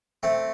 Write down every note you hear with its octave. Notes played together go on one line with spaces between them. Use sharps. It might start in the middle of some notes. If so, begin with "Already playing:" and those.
A3 C4